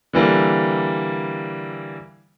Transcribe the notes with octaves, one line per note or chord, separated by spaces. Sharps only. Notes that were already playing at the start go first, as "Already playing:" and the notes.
D3 E3 G3 A#3